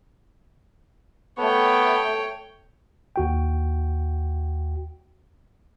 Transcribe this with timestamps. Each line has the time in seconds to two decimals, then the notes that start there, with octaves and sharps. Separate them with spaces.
1.39 A3 B3 C#5 G5
3.16 D#2 F#4 G5